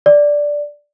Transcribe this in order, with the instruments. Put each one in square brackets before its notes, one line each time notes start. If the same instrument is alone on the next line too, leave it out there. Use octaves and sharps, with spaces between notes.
[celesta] D5